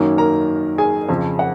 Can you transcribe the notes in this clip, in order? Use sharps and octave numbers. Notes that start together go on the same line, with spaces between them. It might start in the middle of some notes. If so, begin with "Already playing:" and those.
Already playing: F#2 D#3 A#3 C#4
A#4 A#5
G#4 G#5
F2 C#3 F3
F#5